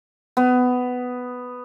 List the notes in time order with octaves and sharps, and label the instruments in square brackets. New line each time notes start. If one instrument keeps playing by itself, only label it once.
[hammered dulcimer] B3